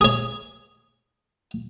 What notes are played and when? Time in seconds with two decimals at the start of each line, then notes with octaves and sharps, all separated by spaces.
0.01 G#4 C#5